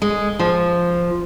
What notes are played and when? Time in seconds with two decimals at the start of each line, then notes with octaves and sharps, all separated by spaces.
0.02 G#3
0.39 F3